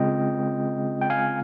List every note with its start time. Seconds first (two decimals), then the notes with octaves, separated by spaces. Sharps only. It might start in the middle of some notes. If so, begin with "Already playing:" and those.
Already playing: C#3 G#3 C4 F4 D#5 G5
1.02 G5
1.10 F5 G#5